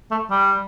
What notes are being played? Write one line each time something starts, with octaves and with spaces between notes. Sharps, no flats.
A3
G3